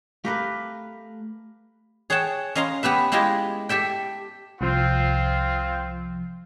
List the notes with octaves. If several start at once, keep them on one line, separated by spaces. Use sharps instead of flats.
A3 G4 A#4 B4 F5
G#4 C#5 F#5 G5 A5
C#4 D#5 F5 A#5 C6
B3 G4 B4 E5
G#3 E4 F4 G4 D#5
G4 A4 E5 G5
C2 F3 C4 F4